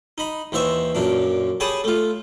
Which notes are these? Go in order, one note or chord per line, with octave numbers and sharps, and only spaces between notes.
D#4 B5
D#2 E3 C5 E5 C#6
F#2 A#2 D4
G4 G#4 C#5 A5 B5 D#6
A3 F4